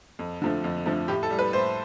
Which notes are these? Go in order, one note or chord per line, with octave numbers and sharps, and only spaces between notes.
F2
D3 F3 A3
F2
D3 F3 A3
A2 G4
A4
G3
B4
A2 C5